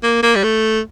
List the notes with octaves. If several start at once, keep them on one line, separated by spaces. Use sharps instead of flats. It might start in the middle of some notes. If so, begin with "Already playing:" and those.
A#3
A#3
G3
A3